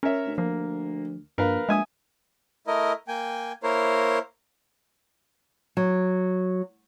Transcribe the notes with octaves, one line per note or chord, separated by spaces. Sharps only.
C#4 A#4 C#5 E5
D2
F3 A#3
A#1 G2 A#4 B4 F5
A#1 G#3 E5 G#5 D#6
A3 E4 A#4 D#5
A#3 G5 G#5
A#3 E4 A#4 C5 C#5
F#3